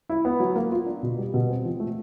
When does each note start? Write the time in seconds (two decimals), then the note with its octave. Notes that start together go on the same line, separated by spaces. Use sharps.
0.09 E4
0.25 B3
0.40 F#3
0.56 A#3
0.72 F4
0.86 D4
1.03 B2
1.18 G3
1.34 B2
1.49 C4
1.65 F3
1.80 A3